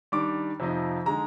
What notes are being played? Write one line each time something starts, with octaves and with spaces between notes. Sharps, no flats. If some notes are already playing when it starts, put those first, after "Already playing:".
D#3 G3 D4 D6
F2 C3 F3 C4 D#4
D3 G#3 D#4 A#5